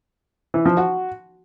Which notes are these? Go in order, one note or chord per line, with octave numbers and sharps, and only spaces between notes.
E3
F3
F#4